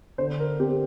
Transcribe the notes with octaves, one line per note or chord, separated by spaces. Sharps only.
D3 C5
A#4
C4 G4